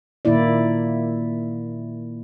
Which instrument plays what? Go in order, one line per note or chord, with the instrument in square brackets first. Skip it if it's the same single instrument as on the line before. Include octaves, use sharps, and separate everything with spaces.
[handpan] A#2 D#3 A#3 E4 D5